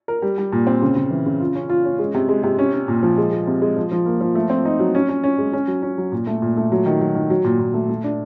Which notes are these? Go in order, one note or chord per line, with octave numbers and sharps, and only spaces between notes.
A#4
G3
G3
A#2
C4
C#3
C#3
E3
C#3
F4
C#4
F4
C#4
G#3
C3
G#3
C3
C#4
C#4
A#2
F3
G#3
G#3
C3
G#3
F3
F3
A#3
F3
A3
C4
D#4
F#3
C#4
C#4
C#4
G#3
C#4
F#3
C#4
F#3
A#2
A3
A#2
A3
F#3
D#3
F#3
D#3
F#3
A#2
A#2
A3
A3
D4